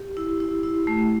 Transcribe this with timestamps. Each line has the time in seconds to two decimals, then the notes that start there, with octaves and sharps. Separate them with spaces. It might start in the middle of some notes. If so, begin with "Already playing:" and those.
Already playing: G4
0.17 E4
0.40 E4
0.63 E4
0.87 A3